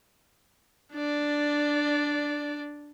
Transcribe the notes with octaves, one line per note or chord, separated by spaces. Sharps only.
D4 D5